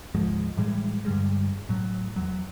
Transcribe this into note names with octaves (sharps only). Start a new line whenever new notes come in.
D2 G#2 F3 G#3
A2 E3 G3 G#3
G2 D3 G3 G#3
A2 F#3
E2 F#3